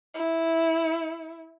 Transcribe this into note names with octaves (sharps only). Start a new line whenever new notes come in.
E4